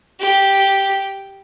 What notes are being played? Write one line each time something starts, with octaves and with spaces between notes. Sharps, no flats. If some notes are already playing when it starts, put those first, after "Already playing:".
G4